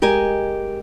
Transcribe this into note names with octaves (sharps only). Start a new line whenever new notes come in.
G#3 G4 A#4 D#5 G#5